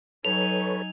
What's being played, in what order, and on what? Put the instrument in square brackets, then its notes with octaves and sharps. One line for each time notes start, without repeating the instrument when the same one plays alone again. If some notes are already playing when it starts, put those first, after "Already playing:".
[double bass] F#3 [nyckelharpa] D#4 G#5 [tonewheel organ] A4 B4 C#5 [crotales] F7